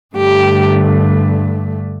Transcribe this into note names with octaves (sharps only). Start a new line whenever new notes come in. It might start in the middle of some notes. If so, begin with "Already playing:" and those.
G2 D3 A3 G4